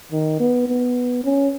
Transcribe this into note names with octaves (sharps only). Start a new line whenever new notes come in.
D#3
B3
B3
C#4